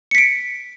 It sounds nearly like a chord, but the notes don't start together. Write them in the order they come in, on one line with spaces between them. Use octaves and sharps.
C#7 B6 D7